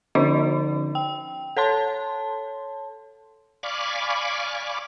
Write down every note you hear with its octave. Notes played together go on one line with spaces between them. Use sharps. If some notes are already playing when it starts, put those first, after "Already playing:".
D3 F3 C#4 D#4 F#4 D5
G5
A4 C#5 A5 C6
D5 F5 G#5 B5 C#6 D6